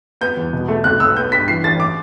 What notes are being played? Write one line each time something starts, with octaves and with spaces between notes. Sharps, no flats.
B3 G6
E2
B2
A3
B1 F#6
B1 E6
B3 G6
G2 B6
E3 C7
A1 A6
D6